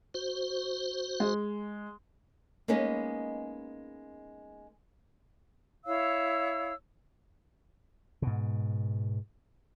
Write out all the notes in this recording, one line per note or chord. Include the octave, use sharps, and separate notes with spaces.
F#4 C5
G#3
G#3 A#3 B3 C#4 D#4
E4 C#5 F5 E6
G#2 B2